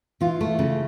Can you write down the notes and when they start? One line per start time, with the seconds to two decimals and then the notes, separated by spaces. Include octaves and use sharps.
0.21 E3 F4
0.41 A3
0.59 C#3